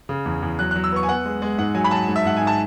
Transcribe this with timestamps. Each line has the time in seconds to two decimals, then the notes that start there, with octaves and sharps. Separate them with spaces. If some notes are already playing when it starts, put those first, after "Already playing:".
0.09 C#3
0.26 E2
0.42 E2
0.59 F#3 F#6
0.71 F#6
0.75 F#3
0.84 E6
0.92 B3 C#6
1.03 G#5
1.08 B3 F#5
1.26 G#3
1.42 G#3
1.58 G#2 F#5
1.74 F#3 G#5
1.84 B5
1.91 F#3 A5
2.08 G#2
2.16 E5
2.25 G#2 F#5
2.37 G#2 G#5
2.47 A5